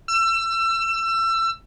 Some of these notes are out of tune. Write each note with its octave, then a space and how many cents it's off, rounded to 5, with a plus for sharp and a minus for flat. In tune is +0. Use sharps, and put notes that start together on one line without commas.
E6 +30